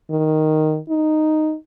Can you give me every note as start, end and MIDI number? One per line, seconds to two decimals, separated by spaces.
0.10 0.78 51
0.89 1.55 63